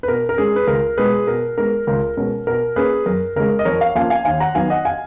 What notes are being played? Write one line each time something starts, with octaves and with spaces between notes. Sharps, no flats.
B4
B2 A#4
A#4
G#3 C#4 G#4
B4
C#2 A#4
B2 G#3 B3 G#4 B4
B2 A#4
G#3 B3 A#4
C#2 A#4
B2 G#3 C#4 A#4
B2 A#4
A#3 C#4 G#4 B4
F#2 A#4
C#3 G#3 A#4
D#5
F2 A#4 C#5
C#5 F5
F3 A#3 C#4 F5 G#5
F5 G#5
D#2 F5 G#5
F#5 A#5
D#3 F#3 B3 F5 G#5
D#5 F#5
F5 G#5